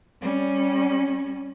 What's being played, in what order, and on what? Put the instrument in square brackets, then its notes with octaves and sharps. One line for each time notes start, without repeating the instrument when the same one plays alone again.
[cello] G3 C#4